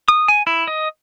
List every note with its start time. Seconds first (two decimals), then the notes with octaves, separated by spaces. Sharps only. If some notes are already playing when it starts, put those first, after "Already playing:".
0.08 D#6
0.28 G#5
0.47 E4
0.67 D#5